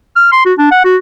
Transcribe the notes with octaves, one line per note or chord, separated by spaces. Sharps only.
F6
C6
F#4
D4
F#5
F#4